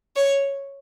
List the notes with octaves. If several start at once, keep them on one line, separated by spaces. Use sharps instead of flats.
C#5